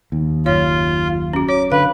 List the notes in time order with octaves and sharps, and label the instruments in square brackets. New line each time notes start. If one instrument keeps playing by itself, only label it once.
[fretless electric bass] D#2
[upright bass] F#1 F#2 [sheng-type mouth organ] F4 [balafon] C#5
[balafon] C#4 F#4
[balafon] C#5 [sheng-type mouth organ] D6
[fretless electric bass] D3 [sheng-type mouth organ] B4 [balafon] F5